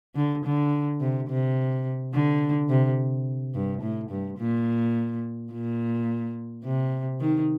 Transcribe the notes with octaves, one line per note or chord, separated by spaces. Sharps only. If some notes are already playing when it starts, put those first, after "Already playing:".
D3
D3
C3
C3
D3
C3
G2
A2
G2
A#2
A#2
C3
D#3